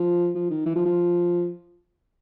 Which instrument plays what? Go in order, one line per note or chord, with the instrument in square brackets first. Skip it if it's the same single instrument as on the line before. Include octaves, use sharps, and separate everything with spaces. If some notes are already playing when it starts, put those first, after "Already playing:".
Already playing: [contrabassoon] F3
F3
D#3
E3
F3
F3